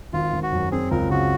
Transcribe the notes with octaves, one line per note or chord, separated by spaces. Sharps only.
G#1 F4
G#1
F#4
F#2
C4 G#4
C#2 A#4
C#3 F#4